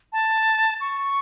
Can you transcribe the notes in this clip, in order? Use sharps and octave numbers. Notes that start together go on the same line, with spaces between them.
A5
C#6